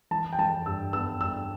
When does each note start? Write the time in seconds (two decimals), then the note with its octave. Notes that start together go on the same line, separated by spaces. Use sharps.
0.11 E3 A5
0.33 G5
0.38 E3 A5
0.66 G2 E6
0.93 B3 E6
1.21 G2 E6